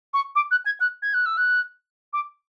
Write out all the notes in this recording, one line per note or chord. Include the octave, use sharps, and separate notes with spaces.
C#6
D6
F#6
G#6
F#6
G#6
F#6
E6
F#6
D6